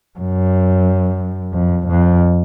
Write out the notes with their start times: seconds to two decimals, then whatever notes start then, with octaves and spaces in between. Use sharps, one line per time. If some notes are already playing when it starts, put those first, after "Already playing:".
0.19 F#2
1.53 F2
1.87 F2